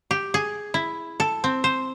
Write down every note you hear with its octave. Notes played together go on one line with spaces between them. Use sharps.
G4
G#4
E4
A4
C4
C5